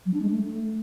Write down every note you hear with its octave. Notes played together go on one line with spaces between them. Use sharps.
F#3
D4
G#3
A3